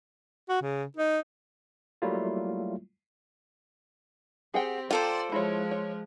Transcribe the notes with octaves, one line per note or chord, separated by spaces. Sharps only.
F#4
C#3
D#4
F#3 G3 A3 A#3 E4 F4
C4 G4 G#4 F#5 G5
F4 A4 C5 D5 G5 A#5
F3 G#3 E4 C#5
C#5